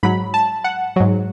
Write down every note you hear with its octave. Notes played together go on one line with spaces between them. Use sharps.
G#2 F#3 B5
A5
F#5
G#2 F#3